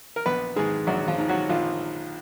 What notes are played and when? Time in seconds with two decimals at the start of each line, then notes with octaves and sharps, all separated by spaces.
0.16 A#4
0.26 A#1 B3 B4
0.56 G#2 D#3 G#3 G#4
0.87 A#1 F#3 F#4
1.08 F3 F4
1.18 G#2 D#3
1.29 F#3 F#4
1.49 A#1 F3 F4